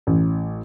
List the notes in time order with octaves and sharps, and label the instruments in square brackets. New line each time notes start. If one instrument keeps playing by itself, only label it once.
[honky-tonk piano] A1